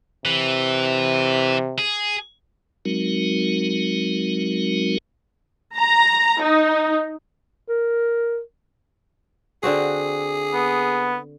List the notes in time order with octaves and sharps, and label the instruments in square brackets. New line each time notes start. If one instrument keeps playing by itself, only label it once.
[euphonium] C3 [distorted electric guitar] E3
[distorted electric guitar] G#4
[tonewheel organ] F#3 G#3 C4 D#4 F#4 A#4
[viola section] A#5
D#4
[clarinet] A#4
[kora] D3 C4 F#4 [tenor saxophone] G#4
[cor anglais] B3